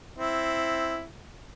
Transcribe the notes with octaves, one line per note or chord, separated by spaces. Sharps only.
C4 E4